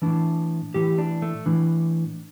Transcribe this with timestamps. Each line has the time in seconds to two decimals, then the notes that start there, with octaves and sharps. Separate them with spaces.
0.02 A2 E3 D4
0.74 A2 E3 G4
0.98 D4
1.22 A3
1.46 A2 E3 D4